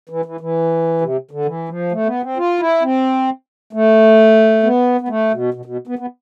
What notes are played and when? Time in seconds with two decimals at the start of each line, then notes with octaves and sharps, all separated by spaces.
0.09 E3
0.25 E3
0.41 E3
1.01 C3
1.31 D3
1.45 E3
1.69 F3
1.92 A3
2.06 B3
2.22 C4
2.37 F4
2.59 E4
2.83 C4
3.73 A3
4.63 B3
5.01 B3
5.08 A3
5.32 B2
5.54 B2
5.65 B2
5.87 B3
5.99 B3